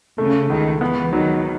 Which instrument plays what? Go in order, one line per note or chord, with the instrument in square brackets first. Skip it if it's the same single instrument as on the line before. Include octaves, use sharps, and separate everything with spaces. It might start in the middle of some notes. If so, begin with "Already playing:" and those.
[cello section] C#3 [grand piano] A3
[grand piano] C#2 [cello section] D#3
[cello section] E3 [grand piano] B3
[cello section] D#3 [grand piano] F#3